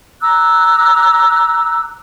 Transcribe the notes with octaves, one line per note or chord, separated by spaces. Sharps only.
A#5 D6 E6 F#6